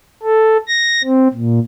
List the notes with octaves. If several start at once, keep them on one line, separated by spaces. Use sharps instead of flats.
A4
A#6
C4
A#2